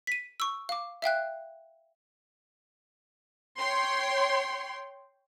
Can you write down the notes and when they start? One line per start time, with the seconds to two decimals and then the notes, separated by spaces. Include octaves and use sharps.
0.07 B6 D#7
0.40 C#6 E6
0.69 F5 D6
1.02 E5 F5 G5 F#6
3.58 C#5 G5 C6